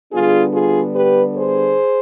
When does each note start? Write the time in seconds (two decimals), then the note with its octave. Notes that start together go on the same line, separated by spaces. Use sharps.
0.12 D3 G3 B3 D4 F4 G#4
0.54 F4 G#4
0.96 G4 B4
1.37 G#4 C5